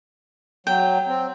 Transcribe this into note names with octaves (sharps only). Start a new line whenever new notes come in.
F#3 G5
C4